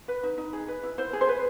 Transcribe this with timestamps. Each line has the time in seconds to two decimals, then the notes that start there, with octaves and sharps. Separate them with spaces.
0.08 B4
0.23 D#4
0.38 D#4
0.53 G#4
0.68 B4
0.83 E4
0.98 E4 C5
1.13 G#4
1.21 C5
1.28 B4